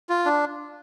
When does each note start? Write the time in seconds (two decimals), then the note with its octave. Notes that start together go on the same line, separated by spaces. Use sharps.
0.09 F4
0.25 D4